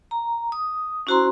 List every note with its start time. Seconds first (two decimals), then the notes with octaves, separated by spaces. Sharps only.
0.11 A#5
0.52 D#6
1.07 C#4 E4 F#4 C5 A#5 C6